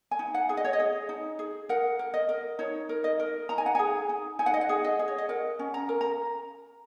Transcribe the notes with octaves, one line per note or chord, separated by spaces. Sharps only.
G#5
D#4
F#5
G#4
D#5
C#5
D#5
G#4
D#4
G#4
A#4 F#5
A#4
D#5
A#4
D#4 C#5
A#4
D#5
A#4
D#4 A#5
G#5
F#5
G#4 G#5
D#4
D#4 G#5
F#5
D#5
F#5
G#4
D#5
G#4
C#5
D#5
A#4 F#5
C#4
A#5
A#4
A#5